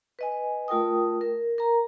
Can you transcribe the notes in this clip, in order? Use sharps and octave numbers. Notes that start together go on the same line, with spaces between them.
B4 D#5 G#5
A3 F4 A#4 G5 D#6
A#4
A#4 A#5